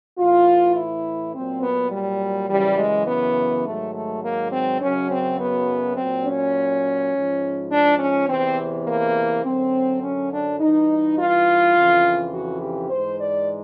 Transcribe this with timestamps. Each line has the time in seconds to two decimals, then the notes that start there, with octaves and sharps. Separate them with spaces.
0.18 A2 E3 F4
0.76 E4
1.34 A#2 F#3 C4
1.62 B3
1.92 G3
2.49 F#2 C#3 E3 G3
2.78 G#3
3.07 B3
3.65 G#2 D#3 F#3 A3
3.93 A3
4.22 A#3
4.51 C4
4.80 F#2 C#3 F#3 C#4
5.09 C4
5.39 B3
5.96 A#2 F#3 C4
6.25 C#4
7.12 G#2 F3
7.70 D4
7.99 C#4
8.28 E2 C3 E3 C4
8.85 A#3
9.43 F#2 D3 F#3 C4
10.01 C#4
10.30 D4
10.59 G2 E3 D#4
11.17 F4
11.74 F2 C#3 E3
12.32 F#4
12.61 G4
12.90 G#2 E3 C5
13.19 D5